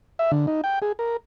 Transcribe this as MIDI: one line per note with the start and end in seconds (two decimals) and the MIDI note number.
0.19 0.31 76
0.31 0.46 50
0.47 0.61 63
0.64 0.79 79
0.82 0.92 68
0.99 1.17 70